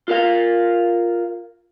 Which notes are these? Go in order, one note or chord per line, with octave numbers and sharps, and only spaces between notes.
F4 A#4 F5